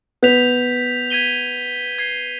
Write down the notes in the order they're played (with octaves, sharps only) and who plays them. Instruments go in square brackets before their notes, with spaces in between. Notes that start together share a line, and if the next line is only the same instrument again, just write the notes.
[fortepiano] B3 [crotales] G6 B6 F7
[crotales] G#6 B6 D#7 G7
G#6 C7 G7